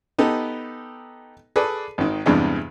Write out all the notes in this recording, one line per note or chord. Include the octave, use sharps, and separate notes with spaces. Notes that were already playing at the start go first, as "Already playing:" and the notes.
B3 D#4 G4 A4
G#4 A4 B4 D5
G#1 D#3
E2 G2 C3 G#3 B3 D4